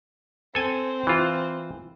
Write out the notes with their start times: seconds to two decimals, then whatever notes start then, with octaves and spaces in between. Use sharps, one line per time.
0.55 C4 A4 G#5
1.07 E3 F4